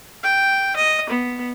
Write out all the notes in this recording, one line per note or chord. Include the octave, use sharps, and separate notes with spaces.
G5
D#5
B3